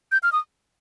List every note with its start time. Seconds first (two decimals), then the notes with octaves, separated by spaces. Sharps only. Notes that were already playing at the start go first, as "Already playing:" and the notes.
0.12 G6
0.23 F6
0.32 D#6